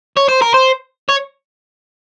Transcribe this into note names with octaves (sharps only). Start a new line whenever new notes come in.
C#5
C5
A#4
C5
C#5